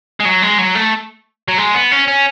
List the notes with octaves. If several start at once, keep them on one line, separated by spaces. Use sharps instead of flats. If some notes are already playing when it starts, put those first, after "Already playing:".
G#3
F#3
G#3
F#3
A3
F#3
G#3
B3
C#4
C#4